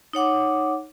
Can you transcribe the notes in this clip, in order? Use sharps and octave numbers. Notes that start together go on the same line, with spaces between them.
D#4 C#5 F#5 D6